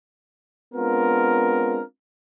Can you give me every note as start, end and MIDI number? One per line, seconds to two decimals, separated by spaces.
0.74 1.80 56
0.74 1.80 59
0.74 1.80 60
0.74 1.80 62
0.74 1.80 65
0.74 1.80 70